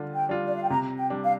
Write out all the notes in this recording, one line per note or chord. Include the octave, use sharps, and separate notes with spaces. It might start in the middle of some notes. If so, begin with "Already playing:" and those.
Already playing: D3 G3 F4
G5
G3 D4 F4
D5
F5
G5
C3 A#5
G5
G3 D4
F5